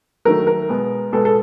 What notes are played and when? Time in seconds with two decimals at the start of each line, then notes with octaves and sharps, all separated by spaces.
0.25 D#3 F#3 A3 A#4
0.47 A#4
0.69 B2 G#3 B3
1.13 B2 G#3 B3 A4
1.25 A4